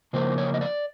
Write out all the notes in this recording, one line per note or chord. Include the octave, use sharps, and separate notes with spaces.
C#3 F3 A#3 C5
C#5
D#5
D5